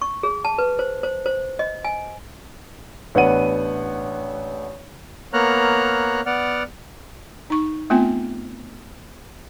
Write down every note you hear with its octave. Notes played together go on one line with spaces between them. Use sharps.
C#6
G#4
A5
B4
C5
C5
C5
D#5
G#5
A1 B3 D4 F#5 D#7
A#3 B3 C#5 A#5 F6 F#6
B3 D5 F#5 F6
D#4 C#6
A3 B3 C4 F4 G5 G#5